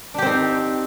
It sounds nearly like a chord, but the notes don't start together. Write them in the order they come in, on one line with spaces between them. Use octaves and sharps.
D4 G4 C4 D#4